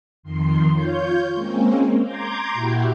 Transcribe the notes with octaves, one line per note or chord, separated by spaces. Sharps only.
F2 D#3 C6
F4 C#5 G6
G#3 A#3 C4 C#4
A#5 C6 D6 G6 G#6
A#2 E4 F#4 G4